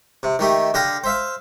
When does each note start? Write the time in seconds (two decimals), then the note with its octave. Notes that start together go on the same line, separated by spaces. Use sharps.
0.23 C3
0.39 D#3 A3 G4
0.74 D3 G4 F5 A#5
1.04 C5 E5 F5